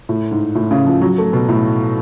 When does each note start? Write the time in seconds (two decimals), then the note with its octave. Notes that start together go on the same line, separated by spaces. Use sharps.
0.09 A2
0.31 G#2
0.55 A2
0.71 C#3
0.87 F3
1.01 F#3
1.18 A3
1.33 B2
1.49 A2